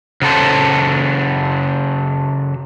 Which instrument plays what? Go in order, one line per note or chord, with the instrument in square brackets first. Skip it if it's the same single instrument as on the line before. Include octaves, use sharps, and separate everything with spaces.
[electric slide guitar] C#3 F#3 A4 C5